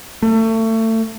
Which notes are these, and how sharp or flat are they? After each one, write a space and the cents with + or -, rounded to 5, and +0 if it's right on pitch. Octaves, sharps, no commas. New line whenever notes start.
A3 +30